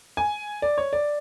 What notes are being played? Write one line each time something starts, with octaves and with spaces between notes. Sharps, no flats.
G#5
D5
C#5
D5